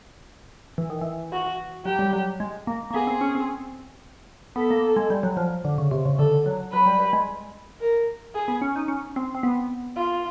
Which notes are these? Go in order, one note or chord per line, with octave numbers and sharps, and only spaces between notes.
E3
D#3
E3
F#4
F#3 G4
G3
F#3
G#3
A#3
A#3
B3 G#4
C4
C#4
C4
B3 A4
A#3
G#3
G3
F#3
F3
D3
C#3
C3
C#3
D3 A4
F#3
F#3 B4
G3
G3
G#3
A#4
G#4
B3
C#4
D#4
C#4
C4
C4
B3
F4